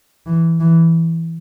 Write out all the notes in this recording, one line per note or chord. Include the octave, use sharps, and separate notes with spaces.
E3
E3